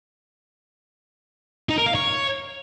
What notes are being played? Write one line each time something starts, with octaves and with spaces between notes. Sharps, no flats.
D#4
A#4
F5
C#5